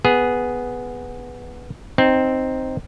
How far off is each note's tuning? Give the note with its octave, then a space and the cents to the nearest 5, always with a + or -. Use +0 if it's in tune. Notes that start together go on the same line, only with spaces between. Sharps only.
B3 +0 G#4 +0
C4 +0 D#4 +0